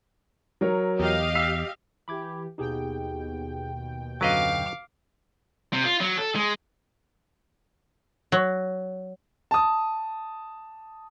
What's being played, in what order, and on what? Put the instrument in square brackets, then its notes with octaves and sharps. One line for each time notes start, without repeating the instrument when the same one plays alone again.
[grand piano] F#3 A#4 C#5
[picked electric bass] E2 [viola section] G4 D#5 F5
[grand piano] E6 B6 C7
[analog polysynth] E3 G4 [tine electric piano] B5 D6 G#6
[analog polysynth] D#2 B2 G5 [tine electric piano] D#4 G4 G#4
[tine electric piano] F#2 D3 [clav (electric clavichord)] F#3 B4 D#5 [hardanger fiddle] F5 D6
[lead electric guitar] C3
F4
F#3
A4
G#3
[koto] F#3
[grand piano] A5 D#6